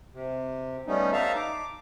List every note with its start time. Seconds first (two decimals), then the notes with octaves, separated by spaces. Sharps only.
0.14 C3
0.87 G3 A3 B3 C#4 D#4
1.13 D#4 E5 F5 A5 A#5
1.36 D6